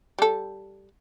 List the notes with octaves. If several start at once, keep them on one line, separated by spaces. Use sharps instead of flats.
G3 A4